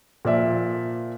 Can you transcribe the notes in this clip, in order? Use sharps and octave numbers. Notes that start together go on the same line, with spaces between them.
A#2 F3 D5 E5